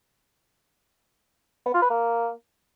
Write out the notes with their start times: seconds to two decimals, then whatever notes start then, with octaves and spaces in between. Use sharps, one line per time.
1.66 B3
1.74 F4
1.82 B4
1.90 A#3